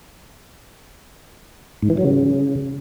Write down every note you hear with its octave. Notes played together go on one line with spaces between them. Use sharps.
G#2
E3
F#3
C#3